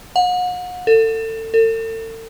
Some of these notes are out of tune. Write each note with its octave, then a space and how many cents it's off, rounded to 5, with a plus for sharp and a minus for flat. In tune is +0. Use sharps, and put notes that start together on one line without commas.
F#5 -40
A4 +30
A4 +40